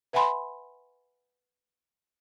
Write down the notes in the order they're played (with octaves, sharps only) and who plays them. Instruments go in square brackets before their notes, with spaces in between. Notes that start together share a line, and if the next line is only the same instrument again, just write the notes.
[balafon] B4 E5 F#5 G#5 B5 C6